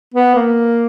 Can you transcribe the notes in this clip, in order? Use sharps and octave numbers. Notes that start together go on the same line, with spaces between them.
B3
A#3